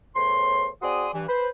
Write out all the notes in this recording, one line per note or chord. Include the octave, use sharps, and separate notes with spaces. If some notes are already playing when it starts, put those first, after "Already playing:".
E2 A2 C5 C#5 C6
C4 F#4 G#4 D5 C6 D#6
G2 E3
B4 C5